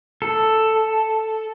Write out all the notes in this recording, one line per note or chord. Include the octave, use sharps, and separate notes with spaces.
A4